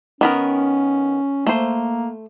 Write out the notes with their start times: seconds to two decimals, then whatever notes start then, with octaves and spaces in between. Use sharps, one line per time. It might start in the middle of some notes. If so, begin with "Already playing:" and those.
0.21 D#3 B3 C#4 A#4
1.47 A3 A#3 C5